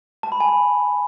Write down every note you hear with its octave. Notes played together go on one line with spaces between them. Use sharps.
A5
B5
G#5
B5